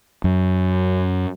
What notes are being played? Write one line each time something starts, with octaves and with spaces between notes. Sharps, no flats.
F#2